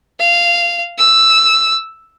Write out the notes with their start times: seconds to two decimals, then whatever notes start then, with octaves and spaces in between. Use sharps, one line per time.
0.20 F5
0.98 E6